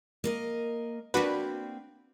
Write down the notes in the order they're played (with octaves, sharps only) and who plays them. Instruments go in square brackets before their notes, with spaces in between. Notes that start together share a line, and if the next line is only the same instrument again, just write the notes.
[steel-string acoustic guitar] A#3 A#4 D#5
[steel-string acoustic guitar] A#3 C4 [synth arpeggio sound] D4 F#4 B4